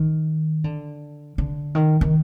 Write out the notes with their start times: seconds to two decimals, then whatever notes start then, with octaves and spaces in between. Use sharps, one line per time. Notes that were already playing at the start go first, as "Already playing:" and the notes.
Already playing: D#3
0.64 D3
1.38 D3
1.75 D#3
2.01 D#3